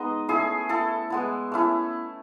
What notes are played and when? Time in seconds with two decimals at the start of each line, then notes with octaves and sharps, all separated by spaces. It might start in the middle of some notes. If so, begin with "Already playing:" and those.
Already playing: G#3 B3 D#4 D#5
0.28 A3 C#4 E4 G#4
0.69 A3 E4 A4
1.10 G#3 B3 E4
1.52 A3 C#4 E4